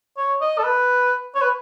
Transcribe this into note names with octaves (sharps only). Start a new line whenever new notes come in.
C#5
D#5
A4
B4
C#5
B4